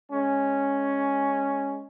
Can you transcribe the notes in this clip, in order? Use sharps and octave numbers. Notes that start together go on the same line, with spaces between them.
G#3 C#4